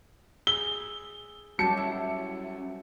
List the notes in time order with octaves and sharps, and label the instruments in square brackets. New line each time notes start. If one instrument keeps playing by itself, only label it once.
[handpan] G#4 [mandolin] E6 [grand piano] G7
[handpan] F#3 F#4 G4 [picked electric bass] G3 C#4 [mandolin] A5 G6 [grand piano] C#7
[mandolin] E4